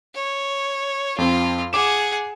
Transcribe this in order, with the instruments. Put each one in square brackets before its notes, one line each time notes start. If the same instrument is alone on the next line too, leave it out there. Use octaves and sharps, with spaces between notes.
[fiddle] C#5
[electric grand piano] F2 C4 [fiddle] F4
[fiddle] G#4 F#5 [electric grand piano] D6 E7